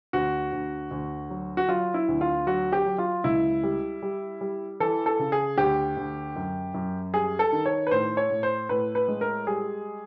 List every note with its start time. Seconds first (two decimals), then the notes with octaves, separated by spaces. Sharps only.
0.13 D2 F#4
0.52 D2
0.91 D2
1.30 F#3
1.57 F#4
1.68 F#3 F4
1.94 E4
2.08 D2
2.21 F4
2.47 F#3 F#4
2.72 G4
2.86 F#3
2.98 F4
3.24 C#2 E4
3.63 G3
4.02 G3
4.41 G3
4.80 E3 A4
5.06 A4
5.19 C#3
5.32 G#4
5.58 D2 G4
5.97 D2
6.36 F#2
6.74 F#2
7.13 G3 G#4
7.39 A4
7.53 D#3
7.66 C#5
7.87 B4
7.91 A2 C5
8.17 C#5
8.30 A2
8.43 C5
8.69 A2 B4
8.95 B4
9.08 G#3
9.21 A#4
9.47 G3 G#4